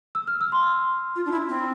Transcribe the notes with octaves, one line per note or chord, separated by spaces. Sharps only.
E6
F6
E6
C6
F4
D4
E4
C4